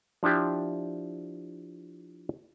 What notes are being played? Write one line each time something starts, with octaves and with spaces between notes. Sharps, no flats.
F3 D4 E4 G4